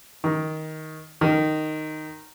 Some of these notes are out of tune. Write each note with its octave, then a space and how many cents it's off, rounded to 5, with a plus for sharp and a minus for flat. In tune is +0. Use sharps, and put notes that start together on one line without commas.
D#3 +10
D#3 -10